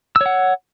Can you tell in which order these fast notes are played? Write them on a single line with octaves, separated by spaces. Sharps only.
E6 C#5 F#5